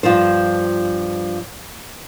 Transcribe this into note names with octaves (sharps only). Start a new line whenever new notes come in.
G2 F3 F4 C5